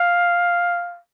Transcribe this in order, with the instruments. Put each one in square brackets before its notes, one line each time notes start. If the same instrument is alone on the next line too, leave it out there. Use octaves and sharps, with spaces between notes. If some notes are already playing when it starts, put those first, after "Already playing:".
Already playing: [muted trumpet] F5